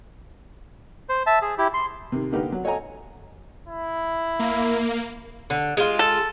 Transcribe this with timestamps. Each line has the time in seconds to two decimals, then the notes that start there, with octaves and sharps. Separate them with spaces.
1.09 C5
1.26 E5 A5
1.42 G#4
1.58 E4 G4
1.74 C6
2.12 C3 D#3
2.32 D3 A#3 D#4 G4 A#4 B4
2.52 F#3
2.64 A4 C#5 D#5 F#5 G#5 A#5
3.67 E4
4.39 A#3
5.50 D3
5.77 G#3 F4
5.99 A4